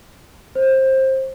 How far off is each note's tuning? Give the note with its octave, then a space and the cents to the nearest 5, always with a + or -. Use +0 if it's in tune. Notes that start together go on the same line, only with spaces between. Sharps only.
C5 +20